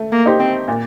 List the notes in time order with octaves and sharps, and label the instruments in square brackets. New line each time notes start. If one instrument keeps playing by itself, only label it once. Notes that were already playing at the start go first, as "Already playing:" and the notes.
Already playing: [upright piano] A3
[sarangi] A#3
[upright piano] D#4 G4 C5
[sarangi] C4
[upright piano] A#2